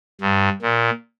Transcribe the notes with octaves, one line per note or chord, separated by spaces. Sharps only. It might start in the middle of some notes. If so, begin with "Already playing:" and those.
G2
A#2